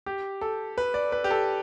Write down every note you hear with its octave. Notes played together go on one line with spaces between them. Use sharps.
G4
A4
B4
D5
B4
G4
A4